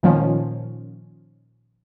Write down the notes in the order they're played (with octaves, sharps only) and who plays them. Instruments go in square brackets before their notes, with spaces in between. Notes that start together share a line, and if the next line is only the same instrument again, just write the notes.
[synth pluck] A#2 D#3 F3 C#4